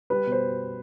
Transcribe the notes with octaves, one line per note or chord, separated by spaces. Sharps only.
G3 B4
B2
C5